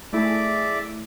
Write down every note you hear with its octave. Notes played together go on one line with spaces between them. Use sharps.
A3 E4 G#4 D5 E5 D6